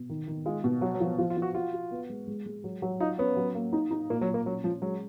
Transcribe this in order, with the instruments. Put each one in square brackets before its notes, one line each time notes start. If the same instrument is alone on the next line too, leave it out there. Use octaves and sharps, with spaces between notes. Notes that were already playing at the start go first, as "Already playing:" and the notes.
Already playing: [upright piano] B2
D#3
D#3
[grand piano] G#3 [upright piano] F4
[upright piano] B2
[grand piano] F#3 [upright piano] F#4
[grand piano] F#3
[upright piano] F3
[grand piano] F#3
[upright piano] F3 [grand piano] F4
[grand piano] F4
[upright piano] F3
[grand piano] F#4
[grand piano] F4 [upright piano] F#4
[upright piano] F#4
B3
G#3
G#3
G#3
F#3
F#3
[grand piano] D#4 [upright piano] F4
[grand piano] B3 [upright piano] C#4
[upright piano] F#3
A#3
D#4
D#4
[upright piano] A#2 [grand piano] A#3
[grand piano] F#3
[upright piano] A#2
[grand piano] A#3
[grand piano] F#3 [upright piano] C#4
[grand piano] F3 [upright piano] C#4
[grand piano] F#3 [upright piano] G#3